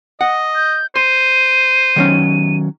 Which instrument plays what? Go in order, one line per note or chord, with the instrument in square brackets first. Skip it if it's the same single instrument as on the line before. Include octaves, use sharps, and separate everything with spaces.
[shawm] D#5 [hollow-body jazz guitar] F#5
[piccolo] G6
[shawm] C5 [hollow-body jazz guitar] C6 [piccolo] D#7
[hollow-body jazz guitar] D#3 F#3 C#4